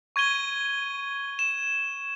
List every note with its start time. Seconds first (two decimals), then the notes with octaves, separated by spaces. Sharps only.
0.16 C#6 G#6 D#7 G7
1.39 E7